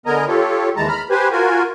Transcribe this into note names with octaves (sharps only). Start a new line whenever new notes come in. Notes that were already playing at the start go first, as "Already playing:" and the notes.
D3 B3 A#4 D#5 G#5 A#5
F4 G4 A4 C#5
D#2 E3 G#3 A5 A#5
A#5 B5 F6
G4 B4 C5 G#5
F4 F#4 A#4 G#5